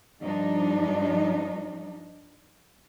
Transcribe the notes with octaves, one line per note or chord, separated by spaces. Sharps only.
G2 F3 D4 D#4